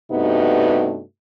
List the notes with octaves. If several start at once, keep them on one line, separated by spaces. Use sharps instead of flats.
G2 C3 A3 B3 D#4 F#4